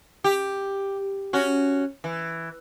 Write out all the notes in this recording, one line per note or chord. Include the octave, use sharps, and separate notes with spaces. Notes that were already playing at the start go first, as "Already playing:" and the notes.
G4
C#4 F#4
E3